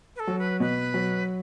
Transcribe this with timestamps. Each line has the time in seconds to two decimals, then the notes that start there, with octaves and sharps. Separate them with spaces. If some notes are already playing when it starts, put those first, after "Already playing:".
0.16 B4
0.20 A4
0.27 F#3
0.39 B4
0.60 B2 B4
0.94 F#3